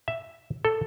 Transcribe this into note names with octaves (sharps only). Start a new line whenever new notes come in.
E5
A4